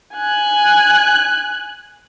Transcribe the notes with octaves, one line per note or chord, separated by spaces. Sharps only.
G#5 F#6